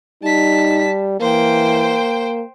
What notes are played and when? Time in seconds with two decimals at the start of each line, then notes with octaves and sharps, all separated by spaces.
0.23 G3 D#4 A5 B6
1.20 E3 A#3 C5 G5